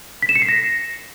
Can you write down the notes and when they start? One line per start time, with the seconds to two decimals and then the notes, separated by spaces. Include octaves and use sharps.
0.22 B6
0.29 E7
0.36 C#7
0.42 C7
0.49 A#6